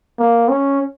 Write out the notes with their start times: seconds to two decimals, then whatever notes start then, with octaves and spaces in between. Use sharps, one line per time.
0.19 A#3
0.49 C#4